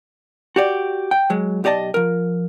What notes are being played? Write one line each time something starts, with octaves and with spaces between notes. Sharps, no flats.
F#4 G4 D5
G5
F#3 G#3
B1 G4 D5 D#5 A5
F3 A#4